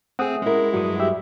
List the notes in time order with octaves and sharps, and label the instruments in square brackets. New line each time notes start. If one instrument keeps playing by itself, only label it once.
[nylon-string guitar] A3 [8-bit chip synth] C4 G#4 [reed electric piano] F#5 D#6
[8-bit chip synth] G#3 E4 [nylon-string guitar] C#4 A#4
[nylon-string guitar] G2 F#3 [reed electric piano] F#4 D#6
[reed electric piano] G4 E5